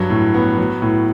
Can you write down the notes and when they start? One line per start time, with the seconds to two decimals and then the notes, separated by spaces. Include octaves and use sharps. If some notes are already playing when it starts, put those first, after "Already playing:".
Already playing: G2 F#3
0.10 A2
0.34 B3
0.58 F#3
0.82 A2